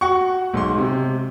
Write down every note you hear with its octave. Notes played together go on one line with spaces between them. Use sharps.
F#4 F#5 C#6
B1 G#2 C6
C3